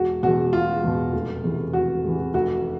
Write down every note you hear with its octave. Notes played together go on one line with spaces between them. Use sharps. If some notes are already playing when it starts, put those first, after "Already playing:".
Already playing: E1 F#4
E2 B2 F#4
E1 F4
E2 B2
F1
E2 C3 E3
F1 F#4
E2 C3 E3
F1 F#4